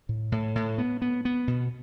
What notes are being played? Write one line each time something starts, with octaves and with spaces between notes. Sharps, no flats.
A2
A2
A2
B3
B3
B3
B2